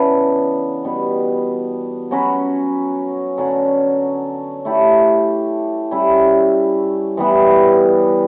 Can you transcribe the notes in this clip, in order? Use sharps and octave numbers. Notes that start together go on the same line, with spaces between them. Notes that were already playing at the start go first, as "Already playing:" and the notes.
Already playing: C#3 E3 B3 D4
B2 G3 B3
F#3 C#4 F#4 B4
D3 F#3 C#4
A3 E4 G4 D5
G3 C#4 E4
E3 G3 B3